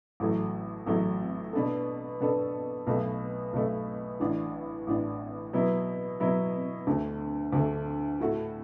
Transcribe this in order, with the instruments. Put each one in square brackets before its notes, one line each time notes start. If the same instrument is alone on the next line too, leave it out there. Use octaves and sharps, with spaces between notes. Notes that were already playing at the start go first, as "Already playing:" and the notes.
[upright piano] A1 A2 F#3 A3
A1 A2 F#3 A3
B2 B3 D4 A4
B2 B3 D4 A4
B1 B2 A3
B1 B2 A3
A1 A2 E3 D4
A1 A2 E3 D4
B2 F#3 B3 E4
B2 F#3 B3 E4
D2 D3 A3
D2 D3 A3
A2 A3 F#4